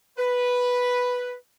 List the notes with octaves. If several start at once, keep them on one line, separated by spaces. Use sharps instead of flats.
B4